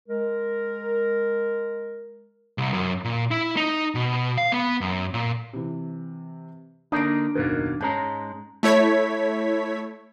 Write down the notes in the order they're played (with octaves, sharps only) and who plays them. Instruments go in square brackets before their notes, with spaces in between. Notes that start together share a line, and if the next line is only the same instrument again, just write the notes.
[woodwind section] G#3 A#4
[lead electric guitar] C2
F#2
A#2
E4
D#4
B2
F5
B3
F#2
A#2
[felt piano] C3 E3
[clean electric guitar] D3 A#3 D#4 [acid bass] D4 [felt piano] D#6 C7 D7
[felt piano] F#1 D#4 A#4 [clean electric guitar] D#2 B2 A#3
[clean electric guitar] G#2 G#3 A#5 [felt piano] C#4 A5
[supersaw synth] A3 E4 C#5 G#6 B6